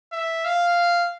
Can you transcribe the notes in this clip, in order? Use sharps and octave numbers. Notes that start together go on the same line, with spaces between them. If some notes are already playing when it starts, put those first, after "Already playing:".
E5
F5